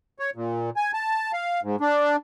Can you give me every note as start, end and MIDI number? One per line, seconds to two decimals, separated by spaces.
0.19 0.30 73
0.35 0.70 46
0.76 0.91 80
0.94 1.32 81
1.33 1.60 77
1.63 1.76 44
1.81 2.16 62